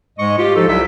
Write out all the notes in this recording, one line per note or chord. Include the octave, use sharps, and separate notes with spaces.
G#2 G#3 D#5 C#6
F4 G4
F3 D#4 A4
C2 F#3 G3 E5